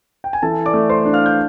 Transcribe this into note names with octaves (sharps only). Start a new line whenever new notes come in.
G5
G#5
E3 A4 A5
D5 D6
A3
C5 C6
D4
F5 F6
G6